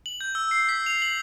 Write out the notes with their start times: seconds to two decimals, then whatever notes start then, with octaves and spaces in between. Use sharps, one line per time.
0.06 F#7
0.21 G6
0.35 E6
0.51 C7
0.69 B6
0.86 F7
1.02 F#7